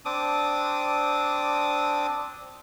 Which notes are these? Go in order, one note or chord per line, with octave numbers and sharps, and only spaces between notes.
C4 D4 D6 D#6